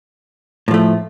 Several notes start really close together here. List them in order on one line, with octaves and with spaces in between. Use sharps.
A2 F3 A3